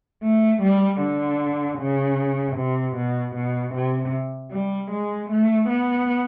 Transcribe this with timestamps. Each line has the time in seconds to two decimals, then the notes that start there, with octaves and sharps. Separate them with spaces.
0.23 A3
0.62 G3
1.00 D3
1.79 C#3
2.56 C3
2.96 B2
3.35 B2
3.74 C3
4.51 G3
4.91 G#3
5.30 A3
5.69 B3